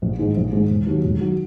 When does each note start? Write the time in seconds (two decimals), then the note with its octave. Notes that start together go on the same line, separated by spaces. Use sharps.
0.02 A#1
0.19 G#2 D#3 G#3
0.37 A#1
0.52 G#2 D#3 G#3
0.70 E1
0.87 D#2 D#3 F#3
1.04 E1
1.21 D#3 F#3